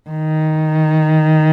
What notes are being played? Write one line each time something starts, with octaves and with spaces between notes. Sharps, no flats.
D#3